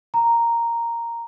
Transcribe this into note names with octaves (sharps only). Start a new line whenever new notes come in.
A#5